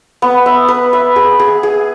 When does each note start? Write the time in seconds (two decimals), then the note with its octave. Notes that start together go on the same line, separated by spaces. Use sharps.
0.22 B3
0.46 E5
0.68 B4
0.93 E5
1.16 G#4
1.39 G#4
1.63 G#4